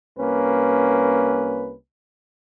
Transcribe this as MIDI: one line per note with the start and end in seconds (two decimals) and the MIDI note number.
0.18 1.74 36
0.18 1.74 58
0.18 1.74 61
0.18 1.74 71